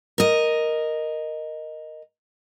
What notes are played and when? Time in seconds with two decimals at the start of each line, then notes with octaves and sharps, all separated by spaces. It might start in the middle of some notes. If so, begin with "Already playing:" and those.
0.18 A#4 D#5